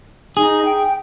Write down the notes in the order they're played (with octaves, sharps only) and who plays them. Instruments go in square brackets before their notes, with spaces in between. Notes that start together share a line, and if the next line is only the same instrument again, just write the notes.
[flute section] D#4 [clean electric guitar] G#4
[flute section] G5